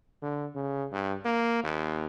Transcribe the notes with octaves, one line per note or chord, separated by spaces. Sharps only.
D3
C#3
G2
A#3
D#2